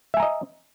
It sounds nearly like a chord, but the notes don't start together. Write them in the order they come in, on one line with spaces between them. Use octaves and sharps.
E5 G#5 A#5 D#5